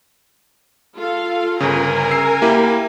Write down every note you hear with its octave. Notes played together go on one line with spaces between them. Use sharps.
F4 A4 F5
G1 C#3 A#4 G#5 A#5
E6 C7
A#3 E4 G4